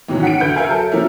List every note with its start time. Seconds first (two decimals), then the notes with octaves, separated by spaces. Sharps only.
0.08 D#2 G#2 B2 E3 F#3 C#4
0.23 F#5 B6 C#7 D7
0.41 D2 B4 G6
0.56 A#4 E5 F5 G#5
0.69 F#3 A4
0.92 F3 A#3 C#4 E4 A#4 E5